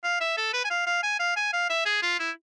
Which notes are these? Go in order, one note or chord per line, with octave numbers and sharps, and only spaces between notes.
F5
E5
A4
B4
G#5
F5
F5
G#5
F5
G#5
F5
E5
G#4
F4
E4